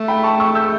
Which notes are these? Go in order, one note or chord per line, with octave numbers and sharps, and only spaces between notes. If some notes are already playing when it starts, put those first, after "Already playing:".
Already playing: A3
G5 B5
A5 C#6
A3 C#6 E6
E6 G6